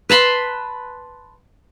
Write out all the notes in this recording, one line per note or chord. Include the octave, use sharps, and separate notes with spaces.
B4 A5 B5 C6